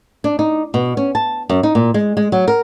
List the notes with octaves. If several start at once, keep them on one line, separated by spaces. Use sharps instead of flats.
D4
D#4
B2
C#4
A5
F#2
D#4
A#2
G#3
G#3
F#3
A#4